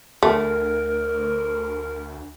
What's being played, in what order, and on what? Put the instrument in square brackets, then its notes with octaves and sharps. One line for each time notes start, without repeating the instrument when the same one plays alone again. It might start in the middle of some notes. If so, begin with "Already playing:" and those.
[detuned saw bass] D2 [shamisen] A3 [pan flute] A#4